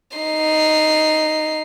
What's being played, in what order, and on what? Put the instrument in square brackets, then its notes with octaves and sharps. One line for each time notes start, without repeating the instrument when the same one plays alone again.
[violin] D#4 C7